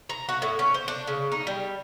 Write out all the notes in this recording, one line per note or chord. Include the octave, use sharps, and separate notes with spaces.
A#5
F#4
A2
C#4
C5
D4
C#3
D#4
G3